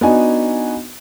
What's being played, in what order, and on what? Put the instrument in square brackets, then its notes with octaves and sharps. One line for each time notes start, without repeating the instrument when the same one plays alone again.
[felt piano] B3 D4 D#4 F#4 G#5